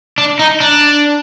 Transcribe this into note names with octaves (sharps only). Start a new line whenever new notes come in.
D4
D#4
D4